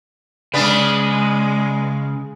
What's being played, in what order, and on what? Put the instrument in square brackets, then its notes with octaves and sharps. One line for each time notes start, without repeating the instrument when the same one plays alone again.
[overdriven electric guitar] C#3 [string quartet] G#3 [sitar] B3 D4 B4